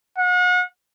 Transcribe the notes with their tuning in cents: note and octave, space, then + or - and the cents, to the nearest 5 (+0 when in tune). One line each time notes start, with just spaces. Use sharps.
F#5 -40